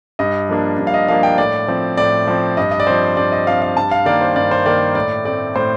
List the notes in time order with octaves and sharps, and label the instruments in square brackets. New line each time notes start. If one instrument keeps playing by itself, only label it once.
[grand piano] G2 D#5
F3 A#3 D4
G2
F5
D#5
F3 A#3 D4 F5
G5
A2 D5
F3 C4
A2 D5
F3 C4
G2 D#5
D#5
D5
F3 C4 C5
G2 D5
D#5
F3 C4 F5
F5
G2 A5
F5
D#3 A#3 D5
C5
G2 D5
C5
D#3 A#3 D5
A2 D5
A3 C4 D5
A2 C5